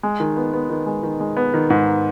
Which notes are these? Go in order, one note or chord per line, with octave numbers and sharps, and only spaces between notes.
G#3
D#3
B3
B3
D#3
G#3
D#3
G#3
B3
D#3
G#2